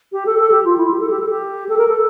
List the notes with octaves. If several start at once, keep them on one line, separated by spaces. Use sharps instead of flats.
G4
A4
A4
G4
F4
E4
G4
A4
G4
A4
G4
A4
A#4
A4